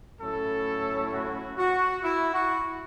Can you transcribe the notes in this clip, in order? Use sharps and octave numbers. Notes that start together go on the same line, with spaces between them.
A2 F#3 C#4 E4 A4
F#4
F#4
E4
F#4